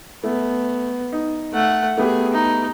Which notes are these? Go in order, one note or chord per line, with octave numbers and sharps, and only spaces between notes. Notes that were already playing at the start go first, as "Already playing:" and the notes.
A3 B3
D#4
A3 F#5
A3 B3 G4 G#4
D#4